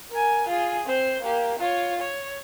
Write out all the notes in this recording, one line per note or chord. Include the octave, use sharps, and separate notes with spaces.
A#4 G#5
F4 G#4
C4 C5
A#3 G4
F4 C#5
C#5